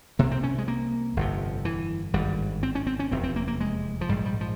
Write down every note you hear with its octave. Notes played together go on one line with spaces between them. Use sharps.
C2 C3 A#3
C4
C#4
G#3
A#3
G1 F2 C3
E3
G#1 G2 G3
C4
C#4
C4
C#4
F1 E2 C3 C4
C4
A#3
A#3
G#3
F3
A#1 G#2 G3
G3
F3